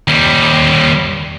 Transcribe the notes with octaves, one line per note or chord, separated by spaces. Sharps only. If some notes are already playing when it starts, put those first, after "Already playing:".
D#2 G3